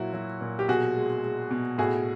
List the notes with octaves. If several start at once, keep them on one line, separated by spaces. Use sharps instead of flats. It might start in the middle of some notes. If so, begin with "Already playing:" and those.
Already playing: A#2 F#3 E4 F#4
F#3
A#2
G4
B2 F#4 G#4
G#3
G#3
B2
A2 F#4 G#4